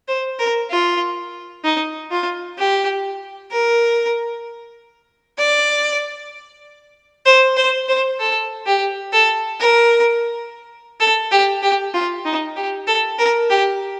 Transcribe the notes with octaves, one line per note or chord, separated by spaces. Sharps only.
C5
A#4
F4
D#4
F4
G4
A#4
D5
C5
C5
C5
A4
G4
A4
A#4
A4
G4
G4
F4
D#4
G4
A4
A#4
G4